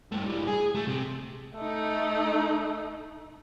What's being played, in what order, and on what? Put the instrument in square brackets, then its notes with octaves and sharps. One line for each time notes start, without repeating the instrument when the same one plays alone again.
[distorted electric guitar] G2 A3
E3 G3
G#4
A3
C3
[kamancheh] A3 D#4